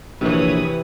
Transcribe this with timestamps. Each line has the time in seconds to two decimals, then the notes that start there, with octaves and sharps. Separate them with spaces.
0.21 A#1 C3 E3 B4 C#5 D#6